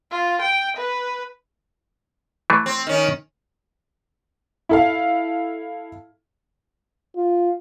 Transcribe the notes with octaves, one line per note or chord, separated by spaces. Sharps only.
F4
G5
B4
E3 A3
C4
D#3 C#4
E4 A4 F5
F4